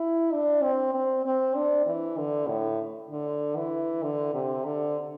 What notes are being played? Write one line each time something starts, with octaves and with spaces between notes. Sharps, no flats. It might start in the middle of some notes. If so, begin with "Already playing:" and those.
Already playing: E4
D4
C4
C4
C4
D4
E3
D3
A2
D3
E3
D3
C3
D3